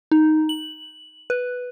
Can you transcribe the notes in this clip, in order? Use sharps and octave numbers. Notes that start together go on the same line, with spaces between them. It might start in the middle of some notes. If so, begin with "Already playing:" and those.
D#4
F#7
B4